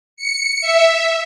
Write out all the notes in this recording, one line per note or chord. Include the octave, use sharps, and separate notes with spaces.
C#7
E5